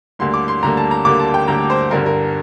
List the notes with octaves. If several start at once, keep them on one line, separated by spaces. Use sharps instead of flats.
D2 D3 G3 A#3 C6
D6
C6
D2 D3 G3 A#3 A#5
A5
A#5
D2 D3 G3 A#3 D6
A5
G5
D2 D3 G3 A#3 A#5
C5
G1 G2 D3 G3 A#4
A#4